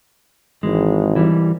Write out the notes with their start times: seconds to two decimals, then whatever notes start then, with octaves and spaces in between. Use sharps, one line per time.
0.63 G#1 E3 G#3
1.16 E3 G3